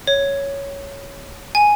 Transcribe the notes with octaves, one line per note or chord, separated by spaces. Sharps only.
C#5
G#5